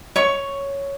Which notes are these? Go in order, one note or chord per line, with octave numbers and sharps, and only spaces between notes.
C#5 C#6